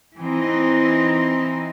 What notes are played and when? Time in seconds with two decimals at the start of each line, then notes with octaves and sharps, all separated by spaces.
0.17 E3 C4 D#4